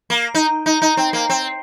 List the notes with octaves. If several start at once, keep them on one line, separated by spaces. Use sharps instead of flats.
A#3
D#4
D#4
D#4
C4
A#3
C4